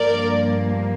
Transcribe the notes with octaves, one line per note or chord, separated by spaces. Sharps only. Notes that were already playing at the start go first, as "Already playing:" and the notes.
Already playing: G2 F3 A#3 A#4 D5